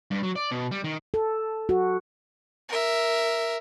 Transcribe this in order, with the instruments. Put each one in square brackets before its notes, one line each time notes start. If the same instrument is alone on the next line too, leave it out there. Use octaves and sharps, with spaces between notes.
[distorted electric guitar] G2
F#3
D5
B2
G3
D#3
[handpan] A4
F#4
[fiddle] A#4 E5